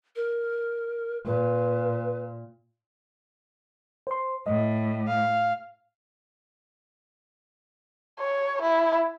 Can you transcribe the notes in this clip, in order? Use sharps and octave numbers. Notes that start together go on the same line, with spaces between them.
A#4
A#2 B4
C5 C6
A2 D#5
F5
C#5
E4